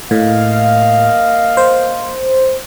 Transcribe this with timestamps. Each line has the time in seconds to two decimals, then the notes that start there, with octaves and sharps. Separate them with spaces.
0.11 A2 A#3 D#5 F5
1.57 C5